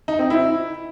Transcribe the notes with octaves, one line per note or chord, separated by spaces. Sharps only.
D#4
C4
E4